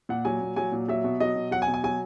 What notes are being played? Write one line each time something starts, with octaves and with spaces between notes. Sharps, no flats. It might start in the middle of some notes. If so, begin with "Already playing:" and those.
A#2 F#5
F#3 G#5
A#2
F#3 G#5
A#2
F#3 E5
B2
F#3 D#5
B2
F#3 F#5
G#5
B2
G#5
F#3 G#5